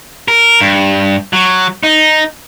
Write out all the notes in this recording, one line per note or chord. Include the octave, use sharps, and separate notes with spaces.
A#4
G2
F#3
D#4